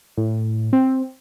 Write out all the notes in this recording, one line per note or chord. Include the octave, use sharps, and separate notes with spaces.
A2
C4